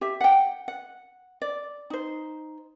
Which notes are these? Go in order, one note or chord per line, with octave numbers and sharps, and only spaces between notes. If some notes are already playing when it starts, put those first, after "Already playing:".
G4 E5
F#5 G5
F#5
D5
D#4 C5